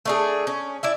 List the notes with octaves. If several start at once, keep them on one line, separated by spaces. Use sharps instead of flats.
A3 D4 G#4
C#4
E4 D5 E5